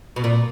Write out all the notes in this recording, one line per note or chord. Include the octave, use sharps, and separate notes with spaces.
B2
A#2